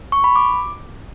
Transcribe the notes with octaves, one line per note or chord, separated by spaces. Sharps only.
C#6
B5
D6